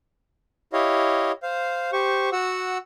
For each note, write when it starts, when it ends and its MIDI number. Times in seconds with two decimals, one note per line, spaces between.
0.73 1.32 64
0.73 1.32 67
0.73 1.32 73
0.73 1.32 75
0.73 1.32 77
1.43 1.91 72
1.43 1.91 77
1.92 2.30 67
1.92 2.30 72
1.92 2.30 85
2.32 2.78 66
2.32 2.78 78
2.32 2.78 88